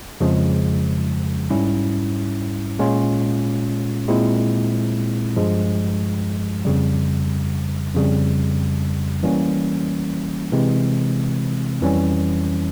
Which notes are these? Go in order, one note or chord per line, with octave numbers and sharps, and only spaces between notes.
F2 C#3 F3 G#3
G#2 G3 C#4 E4
A#2 G#3 C#4 F4
A#2 G#3 C4 E4
G2 F3 G#3
F2 C#3 G3
F2 C#3 G3
E3 G3 A#3 C#4
C3 E3 G#3 C4
F2 E3 G3 C#4